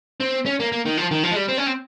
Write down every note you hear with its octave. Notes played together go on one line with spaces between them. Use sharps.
C4
C#4
A#3
A#3
D#3
F3
D#3
F3
G#3
G3
C4
C#4
C4